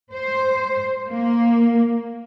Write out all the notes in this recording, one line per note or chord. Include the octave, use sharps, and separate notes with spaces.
C5
A#3